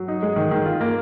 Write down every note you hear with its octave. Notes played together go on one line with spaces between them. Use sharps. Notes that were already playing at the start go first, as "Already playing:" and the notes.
Already playing: F#3
D#4
G#3
D#3
D#3
F4
A#3